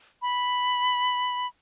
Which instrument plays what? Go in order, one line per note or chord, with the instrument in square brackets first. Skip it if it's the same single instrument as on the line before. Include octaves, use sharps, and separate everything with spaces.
[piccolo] B5